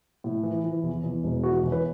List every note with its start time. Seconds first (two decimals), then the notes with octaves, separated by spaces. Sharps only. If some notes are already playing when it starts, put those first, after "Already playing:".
0.24 A2
0.43 E3
0.64 E3
0.83 E2
1.03 E2
1.24 E1
1.43 E3 F#4
1.63 E2
1.72 B4